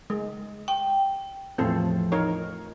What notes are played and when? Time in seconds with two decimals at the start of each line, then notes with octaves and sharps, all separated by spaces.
0.10 G#3
0.68 G5
1.58 E2 A2 F3 C4 A4
2.12 D#4 A#4 C#5